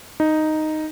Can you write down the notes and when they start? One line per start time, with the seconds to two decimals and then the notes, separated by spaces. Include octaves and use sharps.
0.20 D#4